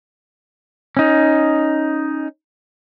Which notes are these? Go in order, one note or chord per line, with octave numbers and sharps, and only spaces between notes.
C#4 D#4